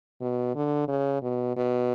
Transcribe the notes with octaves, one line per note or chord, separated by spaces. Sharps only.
B2
D3
C#3
B2
B2